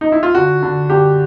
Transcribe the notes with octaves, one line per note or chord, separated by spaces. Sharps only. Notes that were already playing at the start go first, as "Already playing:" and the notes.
D#4
E4
F4
D3 F#4
D3
D3 G4